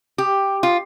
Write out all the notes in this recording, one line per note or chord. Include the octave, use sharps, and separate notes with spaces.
G4
F4